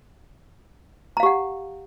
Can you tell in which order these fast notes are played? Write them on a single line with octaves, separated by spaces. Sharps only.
A#5 F5 G4 F#5